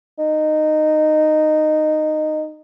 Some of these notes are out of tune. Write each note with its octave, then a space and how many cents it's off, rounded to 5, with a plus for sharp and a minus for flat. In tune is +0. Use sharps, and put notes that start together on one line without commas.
D#4 -15